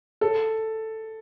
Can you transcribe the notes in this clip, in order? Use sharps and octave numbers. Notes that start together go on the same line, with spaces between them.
A4